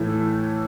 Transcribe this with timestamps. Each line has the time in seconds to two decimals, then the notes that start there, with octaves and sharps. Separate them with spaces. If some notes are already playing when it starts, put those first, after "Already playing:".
Already playing: A2 E3 A3 E4